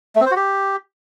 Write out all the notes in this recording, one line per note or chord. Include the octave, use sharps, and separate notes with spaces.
A3
C4
C5
F#4
G4